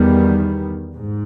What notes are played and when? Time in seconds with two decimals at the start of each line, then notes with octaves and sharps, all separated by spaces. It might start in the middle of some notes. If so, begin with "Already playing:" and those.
Already playing: E2 D#3 G3 B3
0.94 G#2